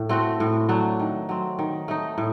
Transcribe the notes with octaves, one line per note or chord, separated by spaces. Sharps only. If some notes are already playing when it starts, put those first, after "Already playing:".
Already playing: A2
A3 C4 F#4
A2
F#3 A3 D4
D#3
F#3 C4
D#3
A3 D#4
A2